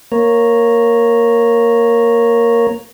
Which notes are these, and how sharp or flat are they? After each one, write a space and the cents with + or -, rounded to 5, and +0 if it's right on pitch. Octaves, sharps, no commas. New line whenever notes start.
A#3 +0 C#5 -5 A#5 +0